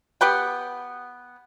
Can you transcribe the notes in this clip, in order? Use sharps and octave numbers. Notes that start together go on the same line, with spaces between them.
B3 G4 B4 G5